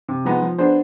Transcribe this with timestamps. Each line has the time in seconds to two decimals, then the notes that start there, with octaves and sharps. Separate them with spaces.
0.08 C3
0.25 F3 G#3 B3 D#4
0.42 F3
0.58 B3 D4 G#4 C5